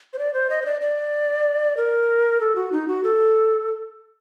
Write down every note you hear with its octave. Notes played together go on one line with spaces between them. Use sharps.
C5
D5
C5
D#5
C5
D5
D5
A#4
A4
F#4
D#4
F#4
A4